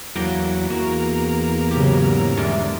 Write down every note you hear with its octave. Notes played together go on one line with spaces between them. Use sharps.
E2 F#3 A#3 G5 A#5
E2 A#3 F#4
G#2 C#3 F#3 G4
E2 D3 G3 G#3 A#4